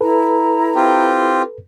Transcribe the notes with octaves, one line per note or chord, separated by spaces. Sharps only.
E4 A4 B4 A#5
C4 F4 G4